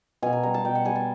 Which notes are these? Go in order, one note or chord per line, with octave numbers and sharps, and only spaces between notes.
B2 G#5
A#5
G3 A#5
A5
B2 G5
F#5
G3 G#5
A5